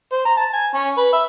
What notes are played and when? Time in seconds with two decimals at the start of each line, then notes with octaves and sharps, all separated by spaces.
0.12 C5
0.25 A#5
0.37 A5
0.53 G#5
0.74 C#4
0.98 B4
1.13 E5